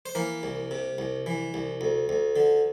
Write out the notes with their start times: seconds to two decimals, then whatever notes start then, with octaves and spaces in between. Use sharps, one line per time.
0.06 C5
0.15 E3 A#3 A#4
0.43 C2
0.71 C3
0.98 C2
1.26 E3
1.54 C2
1.81 D2
2.09 D2
2.36 D3